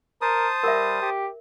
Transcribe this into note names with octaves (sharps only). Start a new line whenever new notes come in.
A#4 C5 A5 D#6
G3 A#4 E5
G4